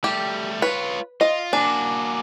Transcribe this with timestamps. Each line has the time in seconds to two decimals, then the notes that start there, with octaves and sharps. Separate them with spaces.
0.04 G3 A3 G4
0.62 F4 B4 C#5
1.21 F4 D#5
1.53 A#3 D4 F#4 G#5 D6